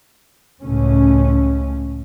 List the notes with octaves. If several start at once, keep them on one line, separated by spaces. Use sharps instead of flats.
C#2 A2 C#4